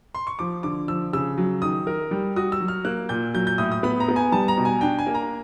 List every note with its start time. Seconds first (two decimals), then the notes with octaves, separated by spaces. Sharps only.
0.15 C6
0.27 C#6
0.39 F3 D6
0.63 D3 D6
0.88 F3 E6
1.13 C#3 E6
1.38 F#3
1.62 D#3 D#6
1.87 A#4
2.11 G3
2.36 F#4 D#6
2.52 E6
2.60 F#3
2.68 F6
2.85 A#3 F#6
3.09 A#2 G6
3.34 F#3 G6
3.47 G6
3.58 A2 D#6
3.72 D#6
3.83 B3 B5
4.00 A#5
4.08 B3
4.16 G#5
4.32 G3 A5
4.48 A#5
4.58 B2
4.65 G#5
4.81 D4 G5
4.99 G#5
5.07 A#3
5.15 A#5